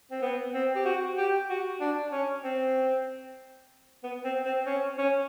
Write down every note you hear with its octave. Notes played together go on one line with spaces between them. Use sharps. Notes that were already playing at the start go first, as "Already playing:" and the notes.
C4
B3
C4
G4
F#4
G4
F#4
D4
C#4
C4
B3
C4
C4
C#4
C#4